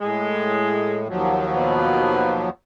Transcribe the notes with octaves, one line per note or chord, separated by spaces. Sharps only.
A2 G#3
D#2 F3 F#3
B2 B4